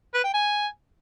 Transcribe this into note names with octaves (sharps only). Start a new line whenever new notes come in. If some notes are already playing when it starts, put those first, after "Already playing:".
B4
G5
G#5